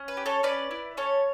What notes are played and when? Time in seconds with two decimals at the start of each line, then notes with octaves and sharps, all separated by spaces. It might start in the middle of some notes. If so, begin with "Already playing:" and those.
Already playing: C#4
0.08 B4
0.17 G4
0.26 A4 C#5
0.43 C#4 B4 D5
0.71 E4
0.97 C#4 A4 C#5